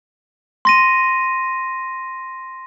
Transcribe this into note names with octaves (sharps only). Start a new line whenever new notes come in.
C6 A#6 D#7